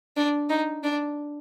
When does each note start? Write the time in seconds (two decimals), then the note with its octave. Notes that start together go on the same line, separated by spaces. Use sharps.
0.17 D4
0.50 D#4
0.84 D4